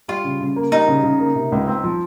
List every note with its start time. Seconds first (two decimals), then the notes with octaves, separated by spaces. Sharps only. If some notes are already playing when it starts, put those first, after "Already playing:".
0.08 G3 F4
0.24 C#3
0.40 C#3
0.56 A#3
0.72 G3 D#4
0.88 C#3
1.03 C#3
1.20 A#3
1.35 C3
1.52 C#2
1.67 C4
1.84 F3